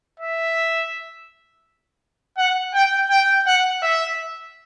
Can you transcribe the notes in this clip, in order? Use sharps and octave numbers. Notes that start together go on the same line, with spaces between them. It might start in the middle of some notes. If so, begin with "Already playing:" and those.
E5
F#5
G5
G5
F#5
E5